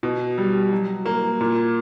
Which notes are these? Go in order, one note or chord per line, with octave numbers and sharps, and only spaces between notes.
B2
G3
F#3
A#3
A#2